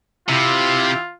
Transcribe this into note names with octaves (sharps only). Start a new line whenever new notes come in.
C3 E4 F4 G4